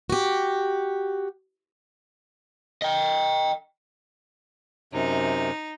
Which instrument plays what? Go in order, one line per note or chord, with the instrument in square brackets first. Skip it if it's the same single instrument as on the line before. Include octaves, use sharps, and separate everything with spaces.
[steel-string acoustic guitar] F#4 G4
[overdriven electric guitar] D#5 G5
[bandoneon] F#2 C3 [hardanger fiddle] D#4